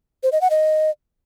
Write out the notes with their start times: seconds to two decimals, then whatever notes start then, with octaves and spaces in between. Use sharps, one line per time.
0.23 C5
0.32 D#5
0.41 F#5
0.50 D#5